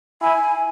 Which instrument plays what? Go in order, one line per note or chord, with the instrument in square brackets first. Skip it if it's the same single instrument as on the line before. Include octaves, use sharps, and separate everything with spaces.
[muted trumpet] E4 [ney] G#5